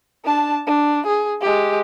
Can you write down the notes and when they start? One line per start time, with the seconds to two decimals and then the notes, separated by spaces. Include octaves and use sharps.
0.24 D4 A5
0.67 D4
1.07 G#4
1.41 G#3 G4